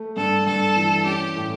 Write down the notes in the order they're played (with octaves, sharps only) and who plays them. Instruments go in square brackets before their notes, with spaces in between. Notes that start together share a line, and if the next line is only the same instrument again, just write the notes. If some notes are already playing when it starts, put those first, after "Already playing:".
Already playing: [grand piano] A3
[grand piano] G2 [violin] A4
[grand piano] G2 [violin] A4
[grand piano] E3
[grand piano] C#4 [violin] G4
[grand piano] A2